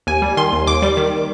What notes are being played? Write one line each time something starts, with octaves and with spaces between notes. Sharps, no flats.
D#2 G#5
G3
D#3 C6
D#2
D#2 D6
G3
D#3